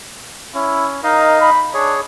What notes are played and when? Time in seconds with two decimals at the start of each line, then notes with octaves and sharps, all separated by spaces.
0.54 C#4 E4
1.03 D#4 A#4 D#5 F5
1.41 B5
1.74 D4 G#4 C#5